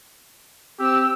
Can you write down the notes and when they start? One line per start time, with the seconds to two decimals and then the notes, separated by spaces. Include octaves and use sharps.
0.79 C4 G4 E6